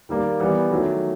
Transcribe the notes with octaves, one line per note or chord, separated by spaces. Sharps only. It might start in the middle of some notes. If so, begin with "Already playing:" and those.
D#3 G3 A#3
E3 G3 B3
D#3 F#3 A3